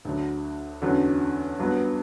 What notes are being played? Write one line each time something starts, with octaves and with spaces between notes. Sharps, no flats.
D2 D3 F#3
E2 D3 F#3 C#4
G2 F#3 B3